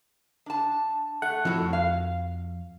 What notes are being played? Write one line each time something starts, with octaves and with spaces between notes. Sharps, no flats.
D4 A5
A3 F#5
F2 A2 F#4
F5